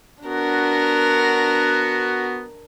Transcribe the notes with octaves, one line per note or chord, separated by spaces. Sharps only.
B3 D4 F#4 A#4